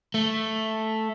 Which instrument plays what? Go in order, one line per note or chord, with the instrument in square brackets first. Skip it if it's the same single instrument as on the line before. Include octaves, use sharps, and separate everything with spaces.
[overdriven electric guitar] A3